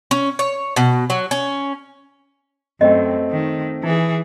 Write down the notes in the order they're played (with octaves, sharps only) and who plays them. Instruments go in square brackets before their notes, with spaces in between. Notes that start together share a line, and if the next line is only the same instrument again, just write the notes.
[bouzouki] C#4
C#5
B2
F#3
C#4
[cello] F#2 [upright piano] A3 C4 [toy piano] D#5 G5
[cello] D#3
[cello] E3 G#4 [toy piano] D#4